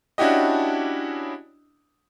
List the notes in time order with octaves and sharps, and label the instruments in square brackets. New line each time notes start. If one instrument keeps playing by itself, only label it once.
[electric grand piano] C#4 D4 E4 F#4 G4 D#5